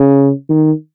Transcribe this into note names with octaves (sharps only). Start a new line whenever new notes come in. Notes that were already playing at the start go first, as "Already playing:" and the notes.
Already playing: C#3
D#3